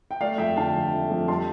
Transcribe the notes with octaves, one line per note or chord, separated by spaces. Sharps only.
G5
A3 D5 F5
F2 E5 G5
D3 F5 A5
F2
A3
F2
G3 A5 C6